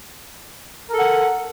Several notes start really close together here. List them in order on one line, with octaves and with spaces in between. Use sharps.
A#4 A4 F#5